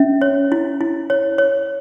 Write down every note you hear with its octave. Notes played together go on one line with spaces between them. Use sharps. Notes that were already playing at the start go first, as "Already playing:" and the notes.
Already playing: C#4 E5
C#5
E4
E4
C#5
C#5